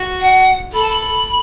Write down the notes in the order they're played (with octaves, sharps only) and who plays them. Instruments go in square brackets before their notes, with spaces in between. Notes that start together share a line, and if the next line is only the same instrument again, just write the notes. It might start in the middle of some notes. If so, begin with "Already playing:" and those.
Already playing: [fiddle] F#4
[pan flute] F#5
[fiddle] A4 [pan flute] B5
[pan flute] A5
B5